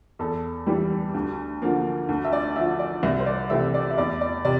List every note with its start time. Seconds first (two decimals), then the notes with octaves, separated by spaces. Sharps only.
0.19 E2 A4
0.67 E3 G3
1.14 D2
1.62 D3 F3 A#3
2.09 D2
2.24 E5
2.33 D5
2.56 D3 F3 E5
2.79 D5
3.03 C2 E5
3.19 C5
3.26 D5
3.50 C3 E3 A3 C4 E5
3.74 D5
3.90 E5
3.98 E2 D5
4.21 D5
4.45 C3 D5